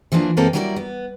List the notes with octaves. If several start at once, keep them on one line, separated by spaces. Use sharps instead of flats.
E3 F3 A#3 B3 D4
F#2 E3 G#3 A#3 C4 A4
F#3 G3 A#3 E4 A#4 D5
B3